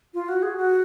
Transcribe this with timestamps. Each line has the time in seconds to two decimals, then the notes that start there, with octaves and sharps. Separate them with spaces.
0.14 F4
0.28 F#4
0.43 G#4
0.57 F#4